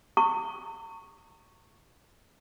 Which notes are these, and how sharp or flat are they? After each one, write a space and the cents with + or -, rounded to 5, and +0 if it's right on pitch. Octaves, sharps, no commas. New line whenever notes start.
A#5 -45 C#6 +0